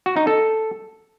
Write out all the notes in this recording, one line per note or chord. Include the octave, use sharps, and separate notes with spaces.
F#4
D#4
A4